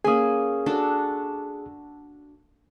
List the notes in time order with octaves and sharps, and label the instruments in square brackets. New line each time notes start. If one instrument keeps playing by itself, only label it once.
[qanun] A#3 C#4 G#5 [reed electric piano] G#4 D#6
[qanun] D4 F#4 A4